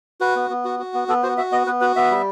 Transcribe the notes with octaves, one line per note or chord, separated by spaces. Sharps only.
F#4 B4
B3
B3
F#4
F#4
B3
B3 A4
F#4 C5
F#4 E5
B3 D#5
B3 B4
F#4 B4
B3 E5
G3